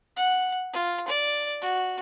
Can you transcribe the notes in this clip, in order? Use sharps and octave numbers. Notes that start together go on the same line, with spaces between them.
F#5
F4
D5
F#4